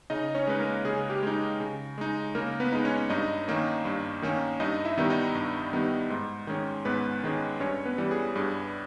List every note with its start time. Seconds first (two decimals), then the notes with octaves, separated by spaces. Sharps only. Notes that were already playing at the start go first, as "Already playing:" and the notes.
0.10 C#3 D#4 D#5
0.34 C#4 C#5
0.47 G#3 D#4 B4
0.60 A#3 A#4
0.85 C#3 G#4
1.10 G4
1.23 G#3 D#4
1.60 C#3
1.98 G#3 D#4
2.35 C#3 A#3 A#4
2.60 B3 B4
2.72 G#3 D#4
2.85 C#4 C#5
3.10 G2 D#4 D#5
3.48 D#3 A#3 C#4
3.85 G2
4.22 D#3 A#3 C#4
4.60 G2 D#4 D#5
4.85 E4 E5
4.98 D#3 G3 B3 D#4
5.10 D#4 D#5
5.35 G2
5.73 D#3 G3 B3 D#4
6.10 G#2
6.47 D#3 G#3 C#4
6.85 G#2 B3 B4
7.23 D#3 G#3 C#4
7.60 G2 C#4 C#5
7.85 B3 B4
7.98 E3 G3
8.11 G#4
8.35 G2 G#4